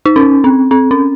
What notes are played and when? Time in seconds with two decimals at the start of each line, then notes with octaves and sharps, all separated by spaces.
0.05 D#4
0.16 C#4
0.44 C4
0.71 C4
0.91 C#4